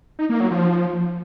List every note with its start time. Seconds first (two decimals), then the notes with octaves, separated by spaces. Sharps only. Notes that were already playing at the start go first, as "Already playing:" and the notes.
0.19 D#4
0.30 A#3
0.40 F#3
0.51 F3